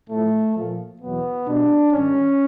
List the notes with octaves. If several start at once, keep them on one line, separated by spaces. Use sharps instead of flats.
A2 F3 A3
A#2 F3
E2 B2 F#3 B3
B2 G3 D4
G#2 D#3 G3 C#4